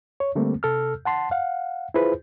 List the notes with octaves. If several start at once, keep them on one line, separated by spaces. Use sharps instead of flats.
C#5
D3 G3 A3 A#3 C4
C3 A4 E6 F6
F#5 A5 C6
F5 F#5
E4 F4 G#4 B4 C5